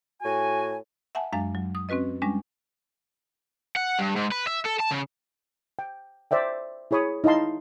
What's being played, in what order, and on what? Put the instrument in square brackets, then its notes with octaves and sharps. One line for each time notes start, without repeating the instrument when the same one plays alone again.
[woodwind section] A2 F#4 G#5
[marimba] E5 F#5 G#5 A5
F#2 F#3 G#3 D4 F5 G#5
F#3
D#6
C4 C#4 F#4 B4 D#5
G3 G#3 C#4 D4
[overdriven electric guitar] F#5
G2
G#2
B4
E5
A4
A5
C#3
[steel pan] G5
C5 D5 E5 G5
E4 G#4 C#5 B5 D#6
D#4 E4 D#5 F5 A5 C6